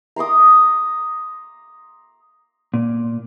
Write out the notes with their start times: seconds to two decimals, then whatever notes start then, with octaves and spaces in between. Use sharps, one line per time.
0.16 A#5 C6 D6 D#6
2.74 A#2